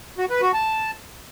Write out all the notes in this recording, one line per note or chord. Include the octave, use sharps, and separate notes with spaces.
F#4
B4
F#4
A5